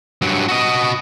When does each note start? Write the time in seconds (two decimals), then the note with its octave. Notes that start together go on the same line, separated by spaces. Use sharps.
0.22 G2 F#3
0.48 F#4 D#5